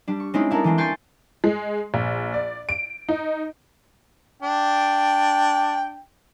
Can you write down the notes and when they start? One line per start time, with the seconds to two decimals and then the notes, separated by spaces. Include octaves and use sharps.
0.08 G3 D4
0.20 C#6
0.34 G#3 C4 C#4 D#4 E4
0.51 D4 E4 A4 A#4
0.64 E3 G#3 C4 D4
0.78 G5 G#5 C6 C#6 G6 A6
1.44 G#3
1.94 A#1
2.34 D5
2.69 D7
3.09 D#4
4.42 D4 G5